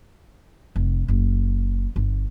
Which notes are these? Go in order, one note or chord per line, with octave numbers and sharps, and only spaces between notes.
F1
F#1
G1